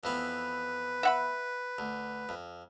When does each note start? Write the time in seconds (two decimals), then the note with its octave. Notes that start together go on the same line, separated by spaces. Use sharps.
0.04 F2 E3 B3 B4
1.03 E5 F#5 B5
1.78 D2
2.29 F2